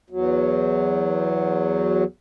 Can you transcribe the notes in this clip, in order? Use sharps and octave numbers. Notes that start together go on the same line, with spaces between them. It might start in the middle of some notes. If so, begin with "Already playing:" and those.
E2 F#3